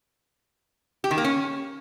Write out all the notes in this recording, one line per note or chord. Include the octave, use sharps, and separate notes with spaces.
G4
D#3
A#3
C#4